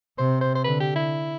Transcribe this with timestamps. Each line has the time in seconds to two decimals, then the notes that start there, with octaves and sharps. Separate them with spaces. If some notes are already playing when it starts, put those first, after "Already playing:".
0.18 C3 C5
0.41 C5
0.55 C5
0.64 D3 B4
0.80 G4
0.96 E4